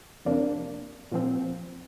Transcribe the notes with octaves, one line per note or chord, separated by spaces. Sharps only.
F2 C3 A#3 D4
A#2 F3 C4